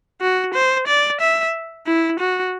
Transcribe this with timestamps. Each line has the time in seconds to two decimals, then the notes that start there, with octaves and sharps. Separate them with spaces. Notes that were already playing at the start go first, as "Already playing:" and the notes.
0.21 F#4
0.54 C5
0.87 D5
1.21 E5
1.87 E4
2.20 F#4